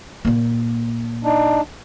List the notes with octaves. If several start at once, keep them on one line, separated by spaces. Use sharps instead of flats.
A#2 A#3
D4 D#4